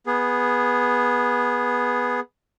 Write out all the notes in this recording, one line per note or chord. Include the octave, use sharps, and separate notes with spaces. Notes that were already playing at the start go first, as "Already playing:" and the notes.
B3 G#4